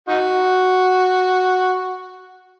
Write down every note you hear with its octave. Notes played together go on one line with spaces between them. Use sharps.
D#4 F#4